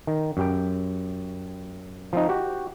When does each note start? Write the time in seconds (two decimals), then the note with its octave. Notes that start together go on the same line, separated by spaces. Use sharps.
0.07 D#3
0.37 F#2 G4 G5
2.13 F3 C4 D#4
2.29 F#4 G4